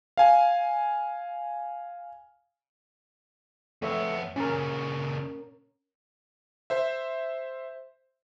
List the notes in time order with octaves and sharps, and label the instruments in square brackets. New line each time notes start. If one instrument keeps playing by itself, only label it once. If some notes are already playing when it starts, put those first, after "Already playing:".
[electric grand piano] F5 G#5
[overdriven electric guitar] F2 B3 [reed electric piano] A3 C#5 E5
[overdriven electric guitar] A#2 C#3 [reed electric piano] C#4 A#4
[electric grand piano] C5 E5